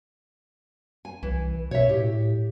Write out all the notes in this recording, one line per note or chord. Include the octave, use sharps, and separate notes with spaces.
G#5
C2 E3
B2 C#5 E5
A2 G4